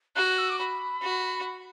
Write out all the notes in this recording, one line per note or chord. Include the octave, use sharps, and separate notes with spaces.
F#4 F#6
E6
D6
B5
F#4